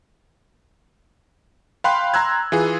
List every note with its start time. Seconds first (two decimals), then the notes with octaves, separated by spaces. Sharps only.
1.84 F5 G5 B5 C6 F#6
2.14 A#5 C6 E6 F#6 G#6
2.52 E3 F4 G#4